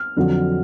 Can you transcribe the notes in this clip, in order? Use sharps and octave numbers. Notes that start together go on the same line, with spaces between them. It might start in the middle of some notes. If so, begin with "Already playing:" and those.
Already playing: F6
F2 D3 F#3